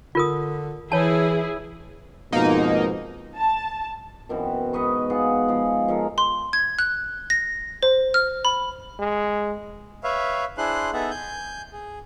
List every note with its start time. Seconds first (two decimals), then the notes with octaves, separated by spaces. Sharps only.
0.15 D3 F4 A#4 D#6
0.92 E3 E4 G#4 C#5 A5
2.32 F2 G#2 B2 A#3 D#4
3.36 A5
4.29 F#2 B2 E3 C4
4.73 G#2 B4 D#5 C#6
5.10 B3 F4 G#4 F#5
5.48 F3 G#3
5.88 F3 G#3 A4 A#4
6.18 C6
6.53 G#6
6.79 F#6
7.30 A#6
7.83 C5
8.14 F6
8.45 B5
8.99 G#3
10.04 B4 C#5 E5 F5
10.58 D4 E4 G#4 C5 C6 F#6
10.93 B3 D#4 G#4 A4 E5 F#5
11.11 G#5 G6
11.72 G#4